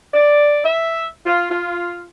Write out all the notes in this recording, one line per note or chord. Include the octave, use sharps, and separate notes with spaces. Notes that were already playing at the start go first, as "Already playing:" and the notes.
D5
E5
F4
F4